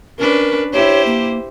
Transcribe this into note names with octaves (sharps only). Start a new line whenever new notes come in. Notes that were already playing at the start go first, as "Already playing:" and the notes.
C#4 D4 A#4 B4
E4 G4 C5 C#5
A#3